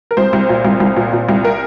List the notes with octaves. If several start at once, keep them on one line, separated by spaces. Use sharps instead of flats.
A#4
C2 C5
C2
A#2
C2
C2
A#2
A#2
C2
A#4